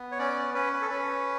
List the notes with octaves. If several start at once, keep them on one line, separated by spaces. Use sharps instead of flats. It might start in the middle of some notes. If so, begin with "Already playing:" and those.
Already playing: B3
C#5
C#4 D5
C#4 B4
B4
A4
C#4 B4